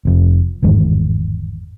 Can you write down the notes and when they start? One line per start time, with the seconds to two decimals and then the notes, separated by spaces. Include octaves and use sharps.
0.05 F1 F2
0.63 G1 E2 G#2 D#3